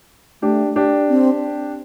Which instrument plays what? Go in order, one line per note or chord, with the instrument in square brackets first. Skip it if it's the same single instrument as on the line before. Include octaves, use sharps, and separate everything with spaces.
[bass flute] A3 [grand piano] D4 G4
[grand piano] D4 G4
[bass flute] C4